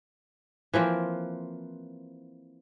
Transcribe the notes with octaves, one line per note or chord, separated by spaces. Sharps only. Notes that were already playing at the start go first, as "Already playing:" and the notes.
E3 F3 A#3 C4